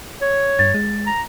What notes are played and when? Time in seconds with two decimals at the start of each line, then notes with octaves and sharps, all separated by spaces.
0.21 C#5
0.59 G2 A6
0.74 G#3
1.06 A#5